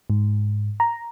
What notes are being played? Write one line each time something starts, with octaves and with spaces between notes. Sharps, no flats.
G#2
A#5